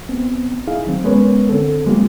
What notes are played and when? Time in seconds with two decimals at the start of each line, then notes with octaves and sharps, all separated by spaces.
0.09 B3 C4
0.67 D#4 E4 G#4 F5
0.86 D#3 F#3 C4
1.04 G#3 B3 C#4 A#4 B4 C#5
1.49 D3 C4 A4
1.86 F#3 G#3 A#3 C4 F4 G4